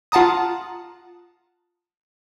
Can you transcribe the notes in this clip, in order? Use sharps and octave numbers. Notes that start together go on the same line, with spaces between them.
F4 F#5 A5 A#5 D#6